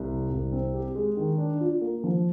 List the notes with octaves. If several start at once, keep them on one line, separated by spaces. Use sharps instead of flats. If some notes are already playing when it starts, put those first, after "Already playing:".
Already playing: C2
C3
C2
C4
G4
G#3
D#3
D4
F4
A#3
F3